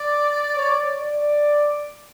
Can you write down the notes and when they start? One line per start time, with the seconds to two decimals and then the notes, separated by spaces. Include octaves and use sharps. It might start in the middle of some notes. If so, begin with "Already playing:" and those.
Already playing: D5
0.56 C#5
1.02 D5